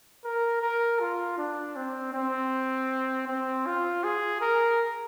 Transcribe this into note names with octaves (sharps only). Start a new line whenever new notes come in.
A#4
A#4
F4
D4
C4
C4
C4
F4
G#4
A#4